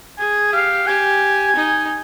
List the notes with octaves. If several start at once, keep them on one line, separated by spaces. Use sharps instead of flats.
G#4 G#5
G4 F5
G4 G#5
D#4